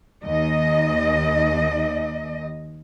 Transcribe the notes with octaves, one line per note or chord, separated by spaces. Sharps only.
D#2 D#5